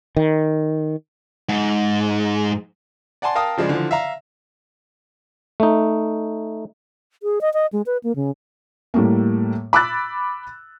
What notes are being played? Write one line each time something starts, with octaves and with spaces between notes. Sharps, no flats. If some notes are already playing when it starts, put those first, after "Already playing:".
D#3
G#2
D5 F#5 G#5 A5 C6
A#4 F5 G5 A5 D#6
C#3 F3 G#3 D5
D3 E3 F3
E5 F5 A#5
A3 D#4
G#4
D#5
D#5
G#3
B4
A#3
C#3
A2 G3 A3 A#3
B5 D6 E6 F#6 A6